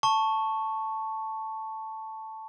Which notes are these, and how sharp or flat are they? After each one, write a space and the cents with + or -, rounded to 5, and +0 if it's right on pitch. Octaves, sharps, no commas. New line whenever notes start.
A5 +0 C#6 +0